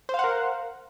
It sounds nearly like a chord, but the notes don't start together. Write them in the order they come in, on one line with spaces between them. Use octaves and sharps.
C5 F5 F#5 A#4